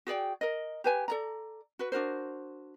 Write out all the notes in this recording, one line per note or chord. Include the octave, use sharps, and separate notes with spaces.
F#4 G#4 D5 G5
A#4 D#5
G4 B4 G#5
A4 D5 A#5
F#4 B4
D4 F#4 A#4 C5